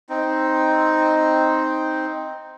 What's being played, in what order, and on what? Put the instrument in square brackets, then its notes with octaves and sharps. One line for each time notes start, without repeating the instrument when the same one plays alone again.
[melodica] C4 D#4